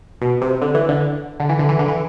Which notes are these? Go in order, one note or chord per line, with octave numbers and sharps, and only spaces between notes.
B2
C3
D3
E3
D3
D3
E3
D3
E3
D3
E3